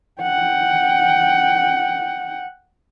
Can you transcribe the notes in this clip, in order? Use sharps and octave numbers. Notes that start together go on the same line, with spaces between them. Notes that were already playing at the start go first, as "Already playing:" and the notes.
F#5 G5